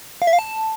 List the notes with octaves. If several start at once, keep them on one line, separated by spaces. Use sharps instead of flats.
F5
E5
F5
A5